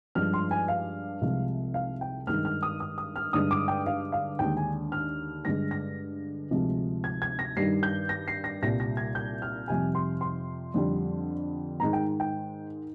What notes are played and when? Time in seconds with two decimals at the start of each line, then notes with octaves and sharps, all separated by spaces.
0.15 G2 F3 G#3 F6
0.34 C6
0.51 G#5
0.68 F5
1.21 C2 C3 F3 G#3
1.74 F5
2.01 G5
2.27 G2 D#3 G#3 F6
2.45 F6
2.63 D#6
2.80 D#6
2.98 D#6
3.16 F6
3.33 G2 D3 G#3 D#6
3.51 D6
3.68 G5
3.86 F5
4.12 F5
4.39 D#2 D3 G#3 G5
4.57 G#5
4.92 F6
5.45 G2 D3 G#3 A#6
5.71 A#6
6.51 D2 C3 F3 G#3
7.04 G#6
7.22 G#6
7.39 A#6
7.56 G2 D#3 G3 C7
7.83 G6
8.09 A#6
8.28 C7
8.44 A#6
8.62 C2 A#2 G3 A#6
8.80 A#6
8.97 G#6
9.15 G6
9.42 F6
9.68 F2 C3 G3 G#5
9.95 C6
10.21 C6
10.74 F2 D3 G3
11.80 G#2 D#3 G#3 A#5
11.93 G5
12.20 G5